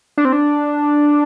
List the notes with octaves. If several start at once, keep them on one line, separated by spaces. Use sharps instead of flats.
D4
C4
D4